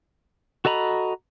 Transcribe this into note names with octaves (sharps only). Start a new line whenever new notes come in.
F#4 A4 D#5 A#5 B5